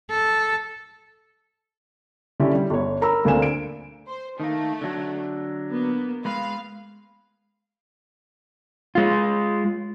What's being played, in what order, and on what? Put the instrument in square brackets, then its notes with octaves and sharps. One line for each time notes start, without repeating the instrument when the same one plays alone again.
[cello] A4
[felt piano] D3 C#4 E4 G4
G3
G1 C#5
A#4 A#5 B5 E6
D2 D3 A#3 C4 G#5 E7
D7
[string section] C5
[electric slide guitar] D#3 A#3 [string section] A3
[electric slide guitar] D3 F#3
[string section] A#3 B3
[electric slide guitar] G#3 B4 [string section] F5
[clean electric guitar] G#3 F4